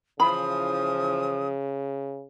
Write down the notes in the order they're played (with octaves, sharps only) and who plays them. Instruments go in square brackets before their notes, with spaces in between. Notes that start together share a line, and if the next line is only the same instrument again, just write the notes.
[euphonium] C#3 [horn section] E3 F3 [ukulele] B5 [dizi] D#6